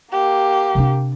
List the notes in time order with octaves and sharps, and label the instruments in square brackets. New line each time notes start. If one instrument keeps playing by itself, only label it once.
[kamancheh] A#3 G4
[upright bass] C3 D4